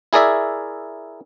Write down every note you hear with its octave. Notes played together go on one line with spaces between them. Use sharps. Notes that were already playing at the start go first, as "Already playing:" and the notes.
E4 G#4 A#4 D5 E5